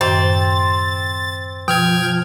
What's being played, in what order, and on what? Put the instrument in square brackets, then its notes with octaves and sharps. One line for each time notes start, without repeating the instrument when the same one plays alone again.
[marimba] F#2 A2 D#3 [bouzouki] C4 [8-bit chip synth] A6
[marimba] B2 [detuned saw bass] F3 [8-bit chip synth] G5 F6 G#6